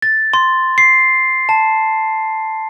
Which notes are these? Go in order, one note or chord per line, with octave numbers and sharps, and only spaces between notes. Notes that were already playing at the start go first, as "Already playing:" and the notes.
A6
C6
C7
A5